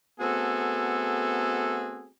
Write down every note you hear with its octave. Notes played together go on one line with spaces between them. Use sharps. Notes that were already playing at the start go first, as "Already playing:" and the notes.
A3 B3 C4 F#4 G#4 A4